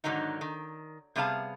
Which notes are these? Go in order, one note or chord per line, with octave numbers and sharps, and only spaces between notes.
G#2 D3 D#3 F#3 D#4
D#3
C3 G3 B3 G#4 F5 A5